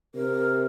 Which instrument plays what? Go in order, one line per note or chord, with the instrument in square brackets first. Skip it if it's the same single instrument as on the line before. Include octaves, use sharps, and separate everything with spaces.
[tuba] C3 [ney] A#4